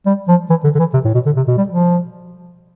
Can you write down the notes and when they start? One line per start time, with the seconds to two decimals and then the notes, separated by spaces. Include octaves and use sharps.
0.06 G3
0.28 F3
0.50 E3
0.64 D3
0.75 D3
0.79 E3
0.94 C3
1.05 A2
1.14 B2
1.26 D3
1.37 C3
1.48 B2
1.58 G3
1.69 F3